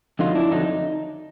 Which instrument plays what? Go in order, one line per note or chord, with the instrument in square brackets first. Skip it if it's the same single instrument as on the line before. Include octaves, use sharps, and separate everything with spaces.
[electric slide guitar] F2 D3 F#3 D#4 F4
D4 E4
F2 D3 F#3 D#4